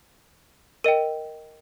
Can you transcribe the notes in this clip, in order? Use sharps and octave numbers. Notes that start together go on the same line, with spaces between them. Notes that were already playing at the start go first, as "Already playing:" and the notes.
A#4 D#5 G5 D#7